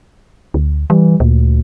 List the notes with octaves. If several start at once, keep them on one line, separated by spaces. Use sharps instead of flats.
D2
E3 G3
D2 A#2